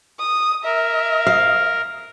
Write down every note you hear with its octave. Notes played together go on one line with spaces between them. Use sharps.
D#6
A#4 E5
F5